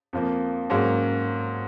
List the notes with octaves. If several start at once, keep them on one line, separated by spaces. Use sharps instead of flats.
F2 F3 A#3
G#2 F#3 A#3 C#4